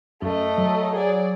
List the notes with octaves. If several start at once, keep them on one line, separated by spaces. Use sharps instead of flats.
F#2 A3 D#5
F#3
G#4 D5